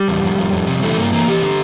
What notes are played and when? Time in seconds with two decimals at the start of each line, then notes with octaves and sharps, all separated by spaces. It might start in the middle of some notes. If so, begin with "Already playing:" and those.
Already playing: G3
0.08 E2
0.23 F2
0.38 F2
0.53 F2
0.67 C3
0.83 E3 A3
0.98 G2 A#3
1.12 E3 A#3
1.27 E3 G4
1.42 D3